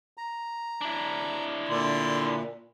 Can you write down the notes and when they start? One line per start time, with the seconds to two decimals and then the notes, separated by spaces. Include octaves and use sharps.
0.18 A#5
0.81 D4 E4
1.69 A#2 D3 C6